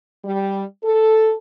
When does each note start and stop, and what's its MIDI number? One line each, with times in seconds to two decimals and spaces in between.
0.24 0.62 55
0.84 1.33 69